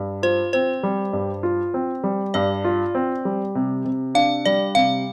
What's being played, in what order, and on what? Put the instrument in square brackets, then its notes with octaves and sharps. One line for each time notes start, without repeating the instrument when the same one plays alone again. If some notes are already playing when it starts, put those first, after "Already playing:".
Already playing: [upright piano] G2
[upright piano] F4 [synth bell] C5
[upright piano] C4 [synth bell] C5
[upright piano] G3
G2
F4
C4
G3
[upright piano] G2 [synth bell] D5
[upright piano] F4
C4
G3
C3
C3
[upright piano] D4 [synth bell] F5
[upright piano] G3 [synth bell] D5
[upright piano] C3 [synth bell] F5